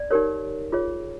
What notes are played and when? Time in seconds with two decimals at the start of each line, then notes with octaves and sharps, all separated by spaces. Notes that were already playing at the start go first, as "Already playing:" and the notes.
Already playing: D5
0.11 D#4 G4 A#4 C#5
0.72 F4 G#4 C#5